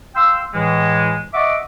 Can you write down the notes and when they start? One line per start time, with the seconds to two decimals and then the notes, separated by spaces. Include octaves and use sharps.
0.15 F5 G5 C6 E6
0.54 A2 E3 G#3
1.34 D#5 E5 F#5 C#6 D6